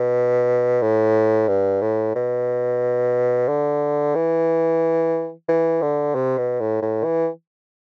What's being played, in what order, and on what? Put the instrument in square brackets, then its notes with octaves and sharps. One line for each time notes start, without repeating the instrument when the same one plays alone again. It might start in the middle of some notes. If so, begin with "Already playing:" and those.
Already playing: [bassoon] B2
A2
G2
A2
B2
D3
E3
E3
D3
C3
B2
A2
A2
E3